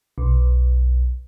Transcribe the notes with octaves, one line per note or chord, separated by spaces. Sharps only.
B1